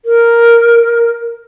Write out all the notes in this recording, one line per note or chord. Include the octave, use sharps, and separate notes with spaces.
A#4